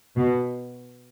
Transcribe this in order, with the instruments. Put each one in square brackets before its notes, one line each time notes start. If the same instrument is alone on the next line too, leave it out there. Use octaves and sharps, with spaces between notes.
[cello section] B2